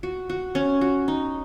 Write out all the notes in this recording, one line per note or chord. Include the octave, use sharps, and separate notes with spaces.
F#4
F#4
C#4
F#4
D#4